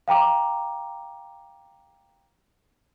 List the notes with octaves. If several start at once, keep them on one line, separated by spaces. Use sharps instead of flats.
F5 G5 A#5 D6